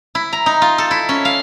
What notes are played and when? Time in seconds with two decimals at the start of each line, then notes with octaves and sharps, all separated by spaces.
0.15 E4
0.33 A#5
0.46 D#4
0.62 F4
0.78 A4
0.91 E4
1.09 C#4
1.25 F5